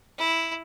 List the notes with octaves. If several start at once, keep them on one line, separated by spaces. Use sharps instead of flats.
E4